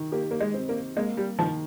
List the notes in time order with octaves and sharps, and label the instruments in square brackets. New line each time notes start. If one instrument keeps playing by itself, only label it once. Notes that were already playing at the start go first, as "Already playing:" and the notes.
Already playing: [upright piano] D#3
[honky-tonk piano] A#3 [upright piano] G4
[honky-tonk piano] A#3
G#3
[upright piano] C4
[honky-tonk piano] A#3
[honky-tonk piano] G#3 [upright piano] A#3
[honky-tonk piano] G3
[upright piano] D#3 [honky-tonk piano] F3